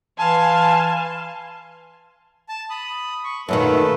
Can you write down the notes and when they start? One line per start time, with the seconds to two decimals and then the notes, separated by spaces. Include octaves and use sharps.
0.19 E3 F5 G#5 A5 C6
2.49 A5
2.70 B5 D#6
3.24 C#6
3.49 F#2 A#2 D#3 A3 A4 B4